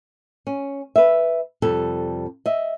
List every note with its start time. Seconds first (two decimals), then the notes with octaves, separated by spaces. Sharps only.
0.47 C#4
0.96 B4 E5
1.62 F2 C3 G3 A4
2.46 D#5 E5